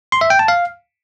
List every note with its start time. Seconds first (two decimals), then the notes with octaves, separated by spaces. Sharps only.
0.12 C6
0.21 E5
0.30 G5
0.39 A5
0.48 F5